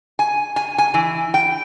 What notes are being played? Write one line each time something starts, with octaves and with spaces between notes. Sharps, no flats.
G#5
G#5
G#5
E3
G5